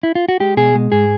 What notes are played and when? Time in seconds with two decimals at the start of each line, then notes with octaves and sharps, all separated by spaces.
0.03 E4
0.15 F4
0.29 F#4
0.40 G#3 G4
0.57 B2 G#4
0.75 G#3
0.92 G#2 G#4